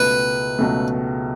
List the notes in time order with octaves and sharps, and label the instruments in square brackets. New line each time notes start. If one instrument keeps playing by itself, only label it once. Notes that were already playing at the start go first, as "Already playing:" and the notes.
Already playing: [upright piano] C#2 B2 A3 [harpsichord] B4
[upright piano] C#2 B2 A3